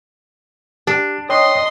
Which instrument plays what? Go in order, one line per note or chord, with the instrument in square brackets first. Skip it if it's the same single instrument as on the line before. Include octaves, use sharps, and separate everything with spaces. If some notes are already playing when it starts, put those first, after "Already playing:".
[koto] D4 [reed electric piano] G4
[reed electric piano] C#5 G5 D#6 [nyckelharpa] D#5 [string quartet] C6